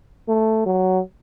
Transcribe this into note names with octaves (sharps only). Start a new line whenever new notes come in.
A3
F#3